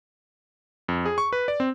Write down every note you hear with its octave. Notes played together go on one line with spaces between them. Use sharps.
F2
G#4
C#6
B4
D5
C4